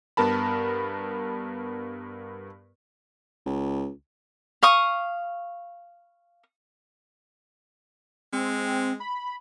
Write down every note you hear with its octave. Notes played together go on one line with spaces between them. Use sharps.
G2 B3 A#4 A5 B5
C#2
F5 C#6 D#6
G#3 C4
B5